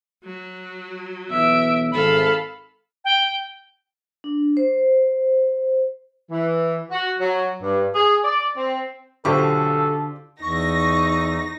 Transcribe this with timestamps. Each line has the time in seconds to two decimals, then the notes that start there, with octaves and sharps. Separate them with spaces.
0.24 F#3
1.30 B1 E3 B3 E5 D7
1.94 G#1 A4 F5 B5
3.04 G5
4.24 D4
4.57 C5
6.30 E3
6.90 F#4
7.19 F#3
7.61 G2
7.94 G#4
8.24 D5
8.56 C4
9.25 B1 D3 F4 G4 A4 C5 C#6
10.42 E2 D#4 C#6 A#6